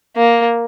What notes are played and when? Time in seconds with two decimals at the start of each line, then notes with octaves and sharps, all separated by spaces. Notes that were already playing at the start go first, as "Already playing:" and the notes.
0.17 A#3